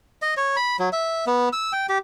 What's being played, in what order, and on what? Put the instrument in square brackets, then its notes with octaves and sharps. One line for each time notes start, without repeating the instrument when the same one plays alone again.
[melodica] D#5
C#5
B5
F#3
E5
B3
E6
G5
G4